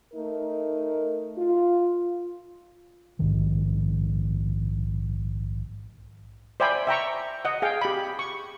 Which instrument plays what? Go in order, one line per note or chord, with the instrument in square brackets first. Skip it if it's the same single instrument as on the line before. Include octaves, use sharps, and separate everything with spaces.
[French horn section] A3 D#4 A#4
F4
[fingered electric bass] A#1 G#2 D#3 F3
[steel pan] C5 D5 E5 G5 G#5 B5
E5 G5 A#5 C#6
D#5 F#5
G#4 F5 G5
G4 B5
C#6